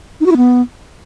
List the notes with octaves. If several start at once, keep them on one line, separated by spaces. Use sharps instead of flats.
D#4
F#4
E4
B3